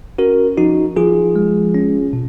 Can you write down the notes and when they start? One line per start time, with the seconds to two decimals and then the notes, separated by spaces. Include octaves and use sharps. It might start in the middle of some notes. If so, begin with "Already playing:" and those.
0.18 C#4 F#4 A#4
0.57 F3 D#4 F#4
0.96 F3 F4 G#4
1.36 G#3
1.74 C#4
2.13 B2